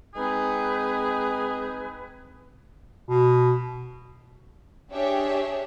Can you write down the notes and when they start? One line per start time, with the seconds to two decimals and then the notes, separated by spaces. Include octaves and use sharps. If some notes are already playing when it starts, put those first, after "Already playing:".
0.15 G#3 C4 D#4 G#4 B4
3.09 B2
4.92 D4 G4 G#4 C#5 E5